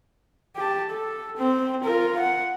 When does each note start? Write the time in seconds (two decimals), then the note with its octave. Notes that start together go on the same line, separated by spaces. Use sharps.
0.56 G4 A5
0.90 A4
1.37 C4
1.84 F4 A#4
2.20 F#5